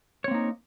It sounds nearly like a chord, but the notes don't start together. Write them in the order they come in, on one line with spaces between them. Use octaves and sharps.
C#5 C4 A#3 D#4